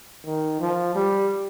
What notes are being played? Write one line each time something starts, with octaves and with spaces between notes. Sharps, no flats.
D#3
F3
G3